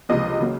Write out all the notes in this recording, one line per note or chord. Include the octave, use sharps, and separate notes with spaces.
C#2 C3 F3 A#3 D#5
C#3 F#3 A#3